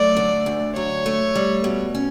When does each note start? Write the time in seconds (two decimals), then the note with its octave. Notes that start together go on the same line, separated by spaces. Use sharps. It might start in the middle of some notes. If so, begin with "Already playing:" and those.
Already playing: F#3 A3 D5
0.17 D3
0.46 D2
0.75 F#3 C#5
1.06 A3
1.35 G3
1.64 B2
1.95 C#4